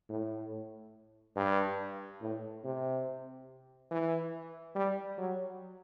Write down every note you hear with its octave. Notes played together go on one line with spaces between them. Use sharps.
A2
G2
A2
C3
E3
G3
F#3